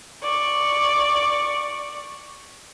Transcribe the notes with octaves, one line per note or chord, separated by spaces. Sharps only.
D5 C#6